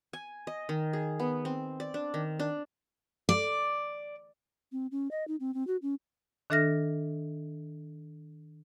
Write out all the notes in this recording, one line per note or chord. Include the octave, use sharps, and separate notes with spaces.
G#5
D#5
D#3
G#4
B3
C4
D5
D4
D#3
D4
D5
C4
C#4
D#5
D#4
C4
C4
F#4
C#4
D#3 D4 A4 E5 F6 A#6